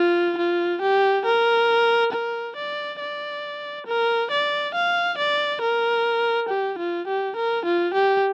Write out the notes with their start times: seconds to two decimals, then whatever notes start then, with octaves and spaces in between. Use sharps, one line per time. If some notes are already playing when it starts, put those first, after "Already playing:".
Already playing: F4
0.38 F4
0.81 G4
1.25 A#4
2.12 A#4
2.56 D5
3.00 D5
3.87 A#4
4.31 D5
4.74 F5
5.18 D5
5.61 A#4
6.49 G4
6.78 F4
7.07 G4
7.36 A#4
7.65 F4
7.94 G4